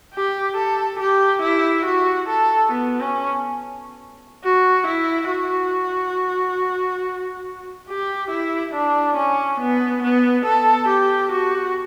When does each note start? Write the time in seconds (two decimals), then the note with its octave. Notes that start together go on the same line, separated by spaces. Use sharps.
0.14 G4
0.57 A4
1.00 G4
1.42 E4
1.85 F#4
2.29 A4
2.72 B3
3.00 C#4
4.44 F#4
4.87 E4
5.30 F#4
7.89 G4
8.31 E4
8.74 D4
9.17 C#4
9.60 B3
10.03 B3
10.46 A4
10.89 G4
11.32 F#4